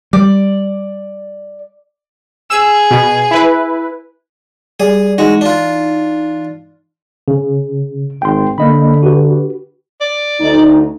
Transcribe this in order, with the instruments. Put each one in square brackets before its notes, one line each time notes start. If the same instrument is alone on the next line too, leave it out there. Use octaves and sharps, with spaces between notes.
[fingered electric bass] G3 [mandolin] D5
[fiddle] G#4 [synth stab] E6
[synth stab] B2
E4 B4
[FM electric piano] G3 D5 [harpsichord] G#4
[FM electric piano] E3 D#4 [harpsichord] G#3 F#4
[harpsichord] D4 F4
[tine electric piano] C#3
[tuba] G#1 [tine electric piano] G5 C6
[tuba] D3 [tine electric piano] A#3 D#5 B5
[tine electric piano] F#4 G4 B4
[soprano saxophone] D5
[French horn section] D2 D#4